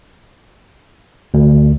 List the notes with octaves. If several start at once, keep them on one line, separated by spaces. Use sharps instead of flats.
D2